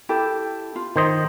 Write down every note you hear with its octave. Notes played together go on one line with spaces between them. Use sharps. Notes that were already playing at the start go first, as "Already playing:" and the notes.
E4 G4 A4
F4
D#3 C5 D#5